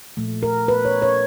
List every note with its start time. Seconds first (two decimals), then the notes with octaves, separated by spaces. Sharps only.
0.17 A#2 F3 A3
0.43 A#4
0.68 B4
0.85 C#5
1.02 C#5